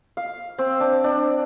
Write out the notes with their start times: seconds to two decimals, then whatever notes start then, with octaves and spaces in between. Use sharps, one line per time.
0.17 F5
0.58 C4
0.80 D4
1.04 D4